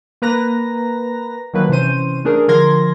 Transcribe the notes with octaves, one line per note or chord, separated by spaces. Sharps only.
A#3 B4 A#5 A#6
D#3 F3 F#3 A#3 B4
C3 E3 C#4 C5 D#7
A3 D4 G#4 A#4
D3 F3 A#4 C6 G#6 A#6